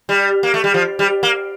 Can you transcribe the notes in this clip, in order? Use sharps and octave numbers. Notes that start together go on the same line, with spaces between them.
G3
A#3
A3
G3
F3
G3
A#3